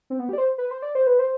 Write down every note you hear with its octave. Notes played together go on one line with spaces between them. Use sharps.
C4
B3
G4
D5
C5
B4
C5
D5
C5
B4
C5